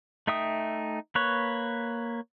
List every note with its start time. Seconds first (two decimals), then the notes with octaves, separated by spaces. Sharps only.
0.27 A3 D#4 E5 G5 D#6
1.15 A#3 B4 C#5